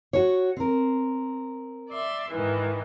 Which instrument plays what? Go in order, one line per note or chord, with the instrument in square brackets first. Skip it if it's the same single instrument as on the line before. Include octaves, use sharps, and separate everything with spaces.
[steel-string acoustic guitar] F#4 C#5
C4 A#4
[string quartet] D5 E5 C6
G#2 D#3 E3